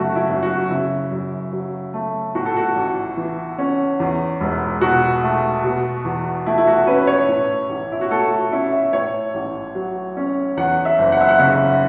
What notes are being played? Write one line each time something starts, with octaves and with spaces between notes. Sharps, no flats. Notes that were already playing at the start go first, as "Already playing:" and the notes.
Already playing: F#2 C#3 A3 F#4
E4
F#2
F#4
C#3 E4
F#2
F#3
A3
A2 F#4
A4
F#4
A1
E3
C#4
E2
E1
B2 F#4
A3
B2
E2
A3 E4
E4
F#4
C#4 B4
C#5
A2
A1
E4
F#4
A3 A4
F#4
C#4 E4
E5
A2 C#5
A1
F#3
C#4
E2 F#5
E5
F#1
F#5
E5
F#5
C#3 E5